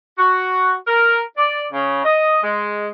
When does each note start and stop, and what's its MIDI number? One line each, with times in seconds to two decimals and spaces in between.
0.18 0.72 66
0.87 1.20 70
1.37 1.64 74
1.72 2.00 49
2.04 2.37 75
2.43 2.87 56